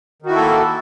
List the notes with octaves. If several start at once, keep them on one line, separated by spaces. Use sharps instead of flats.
D#3 A#3 E4 F#4 A4